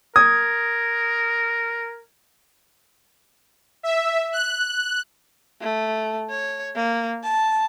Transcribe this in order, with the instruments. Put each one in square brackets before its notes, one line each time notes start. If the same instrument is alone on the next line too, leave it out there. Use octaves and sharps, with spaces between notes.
[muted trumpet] A#4 [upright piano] D#6 [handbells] G#6
[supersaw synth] E5
F#6
[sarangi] A3
C#5
A#3
A5